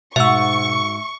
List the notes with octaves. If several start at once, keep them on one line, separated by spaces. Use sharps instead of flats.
G#2 B2 F#4 E5 C#6 E6